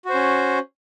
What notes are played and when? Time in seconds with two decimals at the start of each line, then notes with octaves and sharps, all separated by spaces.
0.05 F#4
0.10 C5
0.14 C#4